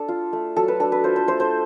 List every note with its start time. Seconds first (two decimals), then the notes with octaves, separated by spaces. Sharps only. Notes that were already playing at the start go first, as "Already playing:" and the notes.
Already playing: D4 A4
0.08 F4
0.33 A3
0.56 F#3 A4
0.68 B4
0.80 D4 A4
0.92 B4
1.04 F4 C5
1.16 C5
1.27 A3 C5
1.40 C5